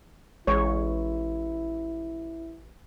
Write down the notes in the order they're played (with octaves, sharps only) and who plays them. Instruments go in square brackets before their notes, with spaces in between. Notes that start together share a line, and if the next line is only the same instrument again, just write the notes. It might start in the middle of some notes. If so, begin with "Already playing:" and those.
[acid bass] A1 [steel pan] G#3 C#5 [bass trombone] E4